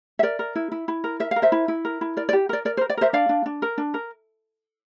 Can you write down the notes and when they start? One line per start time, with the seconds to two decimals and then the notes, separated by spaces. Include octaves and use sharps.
0.19 E5
0.23 A#4 D5
0.39 A#4
0.55 E4
0.72 E4
0.88 E4
1.04 A#4
1.20 A#4 E5
1.31 F5
1.36 A#4
1.42 C5 E5
1.52 E4
1.68 E4
1.85 A#4
2.01 E4
2.17 A#4 D5
2.29 D5
2.33 G4
2.49 A#4 D5
2.65 A#4 D5
2.77 C5
2.81 A#4
2.90 D5
2.97 A#4 C5 E5
3.13 D4 D5 F5
3.29 D4
3.46 D4
3.62 A#4
3.78 D4
3.94 A#4